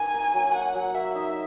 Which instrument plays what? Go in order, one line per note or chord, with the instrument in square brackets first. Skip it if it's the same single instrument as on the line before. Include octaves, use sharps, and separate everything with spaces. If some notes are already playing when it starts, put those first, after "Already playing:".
Already playing: [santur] A#3 D#4 [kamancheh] G#5
[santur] A#4
F#3
[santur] A#3 [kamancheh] F#5
[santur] F#3
[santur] A#3 [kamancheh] E5
[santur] D#4